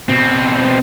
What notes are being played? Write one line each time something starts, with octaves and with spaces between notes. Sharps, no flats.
B2 C4